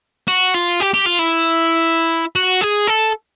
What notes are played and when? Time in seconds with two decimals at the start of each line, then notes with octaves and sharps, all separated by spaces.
0.28 F#4
0.54 F4
0.80 G4
0.94 G4
1.06 F4
1.19 E4
2.36 F#4
2.61 G#4
2.87 A4